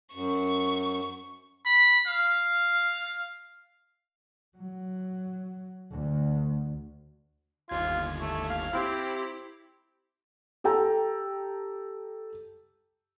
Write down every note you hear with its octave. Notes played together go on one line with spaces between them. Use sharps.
F#2 C#6
B5
F5
F#3
D2
G1 D#2 F4 G#6
A3
F5
C4 E4 G4
G4 A4 G5 A#5